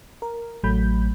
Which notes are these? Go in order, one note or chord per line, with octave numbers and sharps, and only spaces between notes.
A#4
A1 F#3 A3 B5 G6